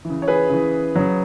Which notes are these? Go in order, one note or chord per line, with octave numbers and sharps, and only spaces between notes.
E3
C#3
C#5
G#4 B4
C#3 E3
C#3 F#3